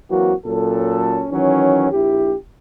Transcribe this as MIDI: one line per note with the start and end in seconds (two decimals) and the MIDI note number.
0.10 0.34 52
0.10 0.34 54
0.10 0.34 58
0.10 0.34 60
0.10 0.34 66
0.46 1.25 46
0.46 1.25 54
0.46 1.25 61
0.46 1.25 69
1.31 1.88 51
1.31 1.88 52
1.31 1.88 54
1.31 1.88 61
1.92 2.35 34
1.92 2.35 64
1.92 2.35 67